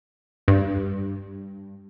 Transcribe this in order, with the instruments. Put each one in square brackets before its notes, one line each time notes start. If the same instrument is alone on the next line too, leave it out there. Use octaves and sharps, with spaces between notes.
[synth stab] G2